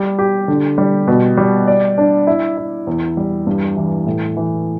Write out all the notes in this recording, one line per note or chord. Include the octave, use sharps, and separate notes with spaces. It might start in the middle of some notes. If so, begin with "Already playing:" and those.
Already playing: G3
G4
D3
G3
B2
G3
D5
D4
E4
E4
E2
G3
G2
E3
A2
E3